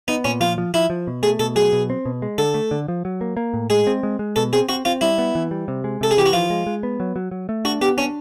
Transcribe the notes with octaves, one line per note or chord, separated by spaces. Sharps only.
B3 D#4
A#2 C#4
F3 F4
F3
F3 E4
F3
B2
A3 G#4
B2 A4
F#3 G#4
B2
C4
B2
G#3
D3 A4
A3
D3
F3
F#3
A#3
A#3
A2
G#3 G#4
C4
G#3
G#3
B2 A4
C4 G#4
C4 F#4
C4 F4
G3 E4
B3
E3
G3
C3
G#3
C3 A4
G#4
E3 G4
F#4
F3 F4
G#3
G#3
B3
F#3
F#3
F#3
A3
D4 F#4
B3 G4
C#4 D4